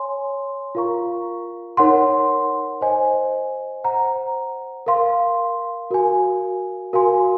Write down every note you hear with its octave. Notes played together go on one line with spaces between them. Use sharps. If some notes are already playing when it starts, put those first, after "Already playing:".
Already playing: C#5 G#5 C6
F4 A#4 F5 A#5 C#6
D#4 A#4 C#5 F#5 C6
C5 D#5 G#5
C5 F#5 A#5
A#4 F5 C6
F#4 A#4 F5 G#5
F#4 A#4 F5 G#5 C6